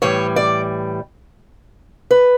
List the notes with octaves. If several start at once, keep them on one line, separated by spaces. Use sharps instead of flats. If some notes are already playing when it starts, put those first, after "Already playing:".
A2 E3 G3 C#5
D5
B4